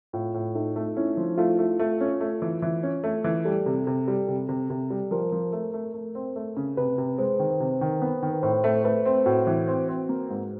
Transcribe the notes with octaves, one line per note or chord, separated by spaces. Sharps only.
A2 F4
A2
A3 D#4
A3
C#4 E4
F3
A3 F4
A3
A3
C#4
A3
E3
E3
C#4
A3
E3
G3 A4
C3
C3
G3
C3
C3
C3
G3
F3 A#4
F3
A3
A3
A3
C4
A3
C#3
C3 B4
C3
G#3 C5
D#3
C3
D#3
B3 B4
D#3
B4
A2 C5
A3
A3 B4
C4
A2 F#4
E3
C4
C4
A#3
G#2